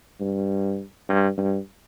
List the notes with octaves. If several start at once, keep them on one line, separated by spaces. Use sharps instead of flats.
G2
G2
G2